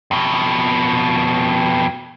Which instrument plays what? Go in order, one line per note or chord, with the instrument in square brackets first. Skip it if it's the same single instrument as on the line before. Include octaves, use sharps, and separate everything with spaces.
[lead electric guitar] F2 B2